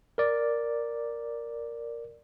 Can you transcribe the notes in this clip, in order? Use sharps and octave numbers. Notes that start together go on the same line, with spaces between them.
A#4 D5